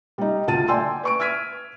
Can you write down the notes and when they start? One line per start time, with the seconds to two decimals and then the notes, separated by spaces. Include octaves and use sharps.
0.18 G3 D#4
0.47 D2 F4 A5 A6 D#7
0.68 D5 G5 G#5 C6 E6
1.03 B4 C#6 D7
1.20 E6 F6 G#6 B6 D7 D#7